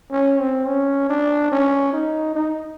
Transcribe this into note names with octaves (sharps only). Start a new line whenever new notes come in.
C#4
C4
C#4
D4
C#4
D#4
D#4